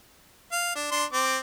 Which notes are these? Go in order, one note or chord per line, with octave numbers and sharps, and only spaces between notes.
F5
D4
D4 C6
C4 D6